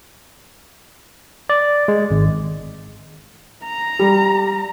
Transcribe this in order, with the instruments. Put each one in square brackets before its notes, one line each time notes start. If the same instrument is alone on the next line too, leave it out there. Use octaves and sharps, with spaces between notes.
[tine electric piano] D5
G#3
G#1
[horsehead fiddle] A#5
[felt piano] G3